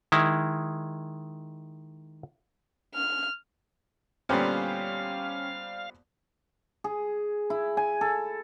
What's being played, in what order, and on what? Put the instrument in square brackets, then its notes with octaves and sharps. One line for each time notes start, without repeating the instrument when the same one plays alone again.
[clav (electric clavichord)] D#3 G#3 E4
[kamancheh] F6
[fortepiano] A#2 D3 B3 [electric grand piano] G3 C5 [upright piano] C#4 G4 [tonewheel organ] F5
[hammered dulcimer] G#4
E4
G#5
A4